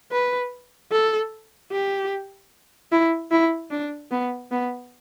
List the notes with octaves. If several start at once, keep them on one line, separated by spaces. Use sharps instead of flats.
B4
A4
G4
E4
E4
D4
B3
B3